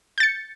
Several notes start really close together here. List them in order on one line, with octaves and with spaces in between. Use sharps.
G6 A6 C#7